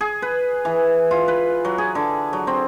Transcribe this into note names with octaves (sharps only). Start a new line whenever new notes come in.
G#4
B4
E3
F4
B4
F#3
G#4
D3
F#3
C4